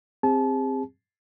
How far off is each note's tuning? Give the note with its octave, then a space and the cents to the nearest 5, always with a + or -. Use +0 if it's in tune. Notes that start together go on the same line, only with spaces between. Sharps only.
C4 +5 G#4 -40 A5 -30